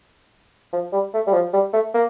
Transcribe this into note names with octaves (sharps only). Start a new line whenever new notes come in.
F3
G3
A3
G3
F3
G3
A3
A#3